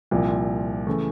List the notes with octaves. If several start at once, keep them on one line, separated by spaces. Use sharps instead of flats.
C2 A#2 F3
C#3 E3 A3